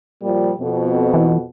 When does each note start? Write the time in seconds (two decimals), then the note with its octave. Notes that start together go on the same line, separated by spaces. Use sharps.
0.22 A#2 F3 G3
0.60 F2 B2
1.14 E3